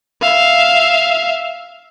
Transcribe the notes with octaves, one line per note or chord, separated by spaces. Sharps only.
E5 F5